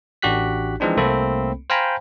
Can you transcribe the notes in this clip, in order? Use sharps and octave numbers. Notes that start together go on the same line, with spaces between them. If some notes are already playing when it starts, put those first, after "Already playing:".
A1 D4 F#4 G4 F#6 B6
E3 F3 G#3 C4 D4 D#4
C2 A3 A#3 C4 A4 B5
C5 F5 G5 G#5 A#5 B5